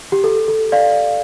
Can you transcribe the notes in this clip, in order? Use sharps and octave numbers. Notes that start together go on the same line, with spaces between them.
G4
A4
A4
D5 F5